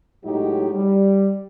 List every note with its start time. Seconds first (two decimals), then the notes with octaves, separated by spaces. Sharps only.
0.24 A2 F#3 G#3 D#4 E4 G4
0.73 G3